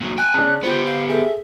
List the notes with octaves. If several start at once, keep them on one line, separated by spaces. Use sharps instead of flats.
A#2 F#3
G5 G#5 F#6
C#3 D4 G#4 A5
B3 F4 G4 C5
F5
G#4 A4 E5